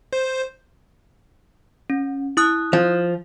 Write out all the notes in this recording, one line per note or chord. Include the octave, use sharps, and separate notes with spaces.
C5
C#4
E4 D#6 F#6
F3